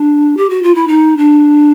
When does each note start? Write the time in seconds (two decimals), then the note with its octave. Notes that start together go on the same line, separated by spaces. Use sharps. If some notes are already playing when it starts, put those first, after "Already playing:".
Already playing: D4
0.37 G4
0.50 F#4
0.63 F4
0.75 E4
0.88 D#4
1.17 D4